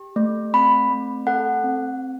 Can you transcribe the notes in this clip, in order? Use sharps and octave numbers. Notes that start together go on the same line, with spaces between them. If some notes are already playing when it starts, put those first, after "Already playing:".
Already playing: G4
A3
C4 B5
A3
A4 F#5
C4